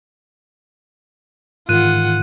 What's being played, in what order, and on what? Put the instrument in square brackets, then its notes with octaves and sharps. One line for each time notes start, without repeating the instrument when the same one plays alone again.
[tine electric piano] G#2 D#3 E3 [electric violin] F4 F#5 [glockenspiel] F#6 D#7